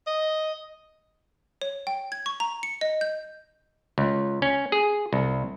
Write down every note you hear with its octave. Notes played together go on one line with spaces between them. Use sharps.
D#5
C#5
G5
G#6
C#6
A#5
C#7
D#5
G6
C#2
C#4
G#4
C2